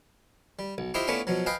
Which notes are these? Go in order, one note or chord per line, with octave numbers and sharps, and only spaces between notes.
G3
B1
E4 F4 G4 C5 D#5 E5
A3 B3 C#4 D4 E4 F4
B2 F3 F#3
B4 D#5 F5 G5 G#5